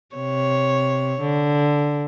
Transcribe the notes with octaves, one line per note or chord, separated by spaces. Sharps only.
C3 C#5
D3